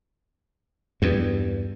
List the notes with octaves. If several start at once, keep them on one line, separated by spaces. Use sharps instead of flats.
E2 G2